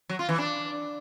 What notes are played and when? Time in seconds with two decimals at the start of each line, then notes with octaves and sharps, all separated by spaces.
0.09 F#3
0.19 F4
0.29 E3
0.38 D4